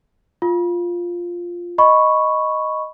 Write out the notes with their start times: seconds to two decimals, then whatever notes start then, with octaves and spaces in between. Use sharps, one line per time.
0.42 F4
1.78 D#5 B5 C#6